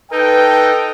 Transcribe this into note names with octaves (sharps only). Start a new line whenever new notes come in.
D#4 A4 B4 G5